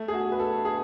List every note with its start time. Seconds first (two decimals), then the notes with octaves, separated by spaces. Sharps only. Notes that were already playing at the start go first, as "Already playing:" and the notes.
Already playing: A3
0.08 G#4
0.14 F#4
0.32 B4
0.40 A4
0.65 G#4